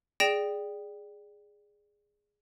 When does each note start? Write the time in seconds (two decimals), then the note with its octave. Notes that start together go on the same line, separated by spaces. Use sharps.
0.20 G#4 D5 G5 A#6 D7 E7